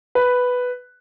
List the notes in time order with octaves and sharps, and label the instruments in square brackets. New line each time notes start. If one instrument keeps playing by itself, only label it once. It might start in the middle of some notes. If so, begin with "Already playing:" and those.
[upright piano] B4